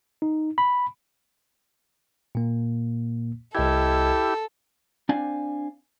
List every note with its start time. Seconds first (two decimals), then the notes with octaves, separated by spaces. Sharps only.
0.22 D#4
0.58 B5
2.35 A#2 A#3
3.55 C2 E4 G4 A4 D#5 G#6
5.09 C4 D4 C5 D5 F5 G#5